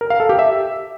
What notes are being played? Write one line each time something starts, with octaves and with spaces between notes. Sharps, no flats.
A#4
F5
A4
G4
E5